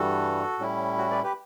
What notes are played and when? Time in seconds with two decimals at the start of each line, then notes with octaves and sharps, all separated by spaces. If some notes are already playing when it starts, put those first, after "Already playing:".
Already playing: G2 E3 G3 F#4 A4
0.59 A2 G3 C#4 E4
0.98 F#4
1.11 B4 D5
1.24 G4 B4